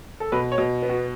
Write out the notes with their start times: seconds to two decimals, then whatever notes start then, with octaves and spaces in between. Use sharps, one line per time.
0.20 A4
0.32 B2 B4
0.52 C#5
0.58 B2
0.82 B3
0.89 F#4